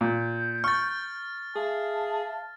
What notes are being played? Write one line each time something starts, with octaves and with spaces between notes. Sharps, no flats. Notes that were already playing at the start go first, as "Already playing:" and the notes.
A#2 G6
C#6 F6 A6
G#4 E5 F5 A5